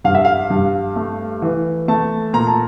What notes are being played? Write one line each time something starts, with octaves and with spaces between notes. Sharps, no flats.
G2 F5
E5
F5
G2
A3
E3
A3 A5
A#2 A#5
A5